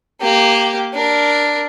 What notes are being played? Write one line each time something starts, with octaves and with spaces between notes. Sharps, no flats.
A#3 G4
D4 A#4